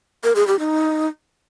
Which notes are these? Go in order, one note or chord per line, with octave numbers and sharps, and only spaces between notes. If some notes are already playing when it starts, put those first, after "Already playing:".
A#4
G#4
G4
D#4